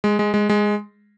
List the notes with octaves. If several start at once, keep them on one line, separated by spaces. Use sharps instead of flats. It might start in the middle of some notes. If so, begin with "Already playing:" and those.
G#3
G#3
G#3
G#3